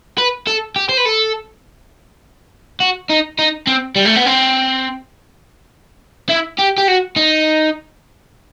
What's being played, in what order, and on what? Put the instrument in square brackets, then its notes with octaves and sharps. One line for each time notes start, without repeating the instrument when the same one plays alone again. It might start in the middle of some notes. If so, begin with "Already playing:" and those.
[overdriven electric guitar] B4
A4
G4
C5
B4
A4
F#4
D#4
D#4
C4
G3
A3
B3
C4
E4
G4
G4
F#4
D#4